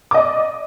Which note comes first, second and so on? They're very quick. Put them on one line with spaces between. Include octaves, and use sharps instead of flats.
D6 D#5 D5